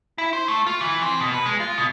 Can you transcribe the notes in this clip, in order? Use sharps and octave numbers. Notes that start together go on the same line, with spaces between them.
E4
C5
A3
F4
E3
C4
B2
B4
G#3
F4
B2